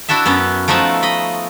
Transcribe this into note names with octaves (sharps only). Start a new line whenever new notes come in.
D4 E4 F#4 A4 E5
F#2 B3 C#4
F3 A3 D#4 E5 F#5 A5
D#5 B5